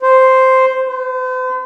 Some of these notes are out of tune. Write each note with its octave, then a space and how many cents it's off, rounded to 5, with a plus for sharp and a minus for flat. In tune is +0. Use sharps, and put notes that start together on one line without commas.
C5 +0
C5 -45